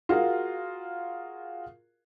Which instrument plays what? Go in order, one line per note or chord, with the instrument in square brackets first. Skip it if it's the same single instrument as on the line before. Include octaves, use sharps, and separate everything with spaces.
[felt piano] F4 F#4 G#4 A#4 F5